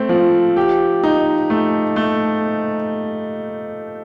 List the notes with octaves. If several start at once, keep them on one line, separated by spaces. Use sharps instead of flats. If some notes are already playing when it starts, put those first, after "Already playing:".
Already playing: A3 C4
F3
G4
D#4
A3
A3